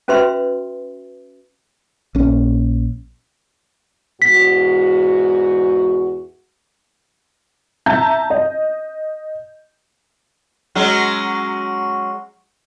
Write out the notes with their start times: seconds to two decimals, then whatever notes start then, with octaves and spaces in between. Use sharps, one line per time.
0.08 C#4 F#4 B4 E5 C6
2.15 A#1 C#4
4.22 E2 G#2 F#4 B6
7.86 E5 A5 A#5 G6
8.30 D#5
10.75 F#3 G#3 C#4